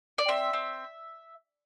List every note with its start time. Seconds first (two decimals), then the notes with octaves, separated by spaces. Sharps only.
0.18 D5
0.28 C4 E5
0.53 C4